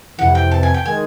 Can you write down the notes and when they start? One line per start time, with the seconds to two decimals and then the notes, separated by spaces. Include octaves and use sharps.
0.18 F2 C3 E3 F#5
0.35 G5
0.51 A5
0.63 G#5
0.74 G5
0.85 D#3 G#3 G#5